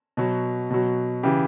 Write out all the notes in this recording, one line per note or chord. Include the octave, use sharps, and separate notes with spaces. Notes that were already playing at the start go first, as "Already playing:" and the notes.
B2 F#3
B2 F#3
C#3 E3 G4